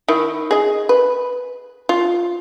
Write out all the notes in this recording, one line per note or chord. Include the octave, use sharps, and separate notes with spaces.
D#3 E4
G#4 D#5
B4
F4